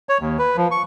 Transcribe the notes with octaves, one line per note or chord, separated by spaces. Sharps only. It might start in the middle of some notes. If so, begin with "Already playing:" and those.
C#5
D#2
B4
F3
C#6